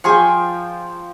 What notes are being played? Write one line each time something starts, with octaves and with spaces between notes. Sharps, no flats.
F3 G#4 G5 G#5 C#6